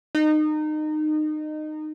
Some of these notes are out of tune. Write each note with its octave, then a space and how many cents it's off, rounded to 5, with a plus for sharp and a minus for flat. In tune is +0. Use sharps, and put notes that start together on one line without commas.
D#4 -25